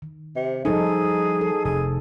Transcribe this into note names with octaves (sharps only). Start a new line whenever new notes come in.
D#3
C3
F3 G3 C#4 D#4 G#4 A4 C5
A4
F1 G#4